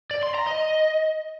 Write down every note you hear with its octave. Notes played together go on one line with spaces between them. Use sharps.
D5
C6
A#5
D#5